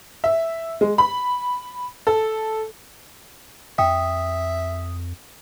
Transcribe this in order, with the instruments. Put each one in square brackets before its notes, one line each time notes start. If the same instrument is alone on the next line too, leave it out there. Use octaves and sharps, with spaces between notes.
[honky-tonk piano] E5
G#3
B5
A4
[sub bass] F2 [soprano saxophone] E5 [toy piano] G5 [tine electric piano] D#6